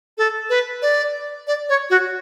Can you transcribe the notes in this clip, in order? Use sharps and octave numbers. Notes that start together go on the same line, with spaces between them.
A4
B4
D5
D5
C#5
F#4